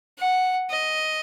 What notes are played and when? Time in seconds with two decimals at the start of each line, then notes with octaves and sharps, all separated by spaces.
0.19 F#5
0.71 D#5